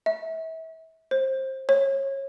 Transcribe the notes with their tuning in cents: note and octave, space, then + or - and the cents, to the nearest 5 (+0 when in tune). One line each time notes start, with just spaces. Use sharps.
E5 -35
C5 +20
C#5 -25